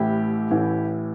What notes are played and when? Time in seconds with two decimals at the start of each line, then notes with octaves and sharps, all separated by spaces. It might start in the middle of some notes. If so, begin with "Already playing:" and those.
Already playing: A1 A2 E3 E4 G4
0.51 A1 A2 E3